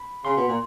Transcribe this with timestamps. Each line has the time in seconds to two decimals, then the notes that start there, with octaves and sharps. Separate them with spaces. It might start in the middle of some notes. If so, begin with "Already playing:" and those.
Already playing: B5
0.25 C#3 C6
0.37 B2
0.48 A#2